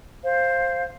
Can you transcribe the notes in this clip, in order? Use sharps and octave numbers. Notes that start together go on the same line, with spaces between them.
C5 F5